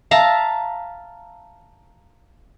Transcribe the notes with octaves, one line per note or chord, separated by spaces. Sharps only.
E5 F5 A5 A#5